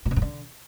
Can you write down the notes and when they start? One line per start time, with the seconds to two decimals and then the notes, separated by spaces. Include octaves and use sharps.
0.06 A#2
0.11 B2
0.16 G2
0.22 D3